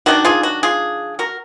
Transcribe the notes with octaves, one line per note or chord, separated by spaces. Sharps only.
D#3 F#3 D4 F#4
F4 G#4
F#4
F4 G#4
F#4 A#4